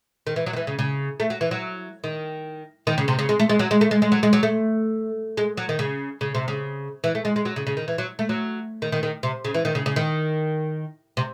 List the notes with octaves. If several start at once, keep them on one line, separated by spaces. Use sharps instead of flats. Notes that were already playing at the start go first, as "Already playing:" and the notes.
D#3
E3
F#3
D#3
E3
C#3
C#3
A3
F#3
E3
F#3
D#3
D#3
C#3
C3
C#3
G#3
A3
G#3
F#3
G#3
A3
G#3
G#3
F#3
G#3
F#3
A3
G#3
F#3
D#3
C#3
C#3
C3
C#3
E3
A3
G#3
G#3
F#3
C#3
C#3
D#3
E3
F#3
A3
F#3
D#3
D#3
D#3
C3
C#3
E3
D#3
C#3
C#3
D#3
C3